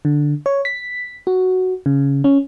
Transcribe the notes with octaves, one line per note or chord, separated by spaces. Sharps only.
D3
C#5
B6
F#4
C#3
C#4